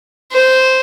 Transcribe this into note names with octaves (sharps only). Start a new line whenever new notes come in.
C5